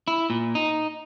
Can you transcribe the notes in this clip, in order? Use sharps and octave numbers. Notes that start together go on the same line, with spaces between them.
E4
A#2
D#4